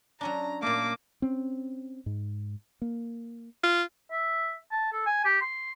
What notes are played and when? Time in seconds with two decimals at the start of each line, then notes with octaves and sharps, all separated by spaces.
0.21 F#3 C#4 D4 A#5
0.63 A#2 A3 A#3 D6
1.22 C4 C#4
2.06 G#2
2.82 A#3
3.63 F4
4.11 E5
4.71 A5
4.93 A4
5.06 G#5
5.25 G4
5.41 C6